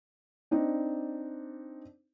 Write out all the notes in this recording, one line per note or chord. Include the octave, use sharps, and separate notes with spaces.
C4 D4 D#4